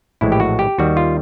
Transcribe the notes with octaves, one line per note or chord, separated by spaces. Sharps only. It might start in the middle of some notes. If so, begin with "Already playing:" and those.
A#1 A2 E3 G#3 E4
G4
F#4
G4
D#2 D#3 G3 F#4
F4